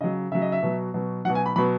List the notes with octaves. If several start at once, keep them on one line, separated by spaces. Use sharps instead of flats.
C#3 F#3 D#5
C#3 F#3 E5
D#5
E5
B2 F#3
B2 F#3
B2 F#3 F#5
G#5
B5
B2 F#3 B5